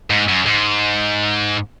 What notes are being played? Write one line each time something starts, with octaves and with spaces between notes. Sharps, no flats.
G#2
F#2
G#2